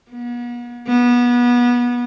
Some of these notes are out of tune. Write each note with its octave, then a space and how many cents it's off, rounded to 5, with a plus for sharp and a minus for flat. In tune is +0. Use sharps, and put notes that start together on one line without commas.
B3 -40
B3 -25